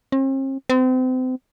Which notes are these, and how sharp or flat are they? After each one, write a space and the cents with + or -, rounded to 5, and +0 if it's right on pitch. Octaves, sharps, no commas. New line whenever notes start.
C4 +45
C4 -35